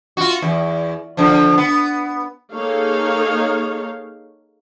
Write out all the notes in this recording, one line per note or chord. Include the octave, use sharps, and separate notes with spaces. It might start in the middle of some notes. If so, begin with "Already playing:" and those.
F4 F#4
E2
D3 F3
B3
A#3 D#4 G#4 A4 C#5 F5